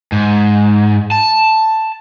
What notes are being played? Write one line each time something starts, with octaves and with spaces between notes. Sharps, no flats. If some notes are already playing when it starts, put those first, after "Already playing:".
G#2
A5